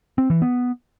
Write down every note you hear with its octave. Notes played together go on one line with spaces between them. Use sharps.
C4
E3
B3